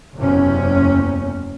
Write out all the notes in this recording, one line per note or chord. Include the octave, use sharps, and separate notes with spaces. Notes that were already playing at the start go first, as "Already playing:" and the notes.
F#1 E2 C3 C#4